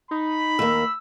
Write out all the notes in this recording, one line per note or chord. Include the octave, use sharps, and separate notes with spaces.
D#4 B5
D#2 A#3 E6